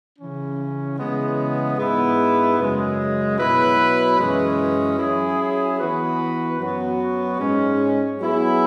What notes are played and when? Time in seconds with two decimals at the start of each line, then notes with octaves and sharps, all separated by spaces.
0.18 C#3 E3 C#4
0.98 C#3 E3 G#3 B3
1.78 G#2 G#3 B3 E4 B4
2.59 F#2 C#3 G#3
3.38 B2 F#3 E4 B4
4.19 F#2 E3 G#3 C#4
4.99 F#3 C#4 E4 G#4
5.79 E3 B3 F#4 B4
6.60 F#2 F#3 B3 F#4
7.40 G#2 G#3 C#4
8.20 F#3 B3 E4 G#4